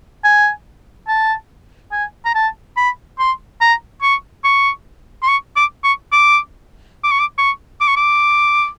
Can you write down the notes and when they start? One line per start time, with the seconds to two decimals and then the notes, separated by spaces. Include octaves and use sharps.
0.24 G#5
1.08 A5
1.92 G#5
2.25 A#5
2.35 A5
2.77 B5
3.19 C6
3.61 A#5
4.02 C#6
4.44 C#6
5.23 C6
5.28 C#6
5.56 D6
5.84 C#6
6.12 D6
7.04 D6
7.12 C#6
7.20 D6
7.38 C#6
7.81 D6
7.88 C#6
7.96 D6